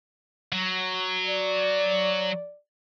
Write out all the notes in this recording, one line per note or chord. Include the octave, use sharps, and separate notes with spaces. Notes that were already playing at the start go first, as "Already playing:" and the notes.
F#3
D5